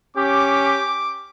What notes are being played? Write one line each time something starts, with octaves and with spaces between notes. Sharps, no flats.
C#4 G4 D6